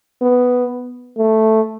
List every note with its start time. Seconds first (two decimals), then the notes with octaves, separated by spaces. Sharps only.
0.21 B3
1.18 A3